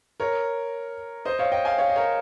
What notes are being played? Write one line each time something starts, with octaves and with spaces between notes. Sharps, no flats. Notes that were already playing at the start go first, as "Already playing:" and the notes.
A#4 C#5
C5 D#5
C#5 F5
D#5 G5
F5 G#5
C#5 F5
D#5
A#4 C#5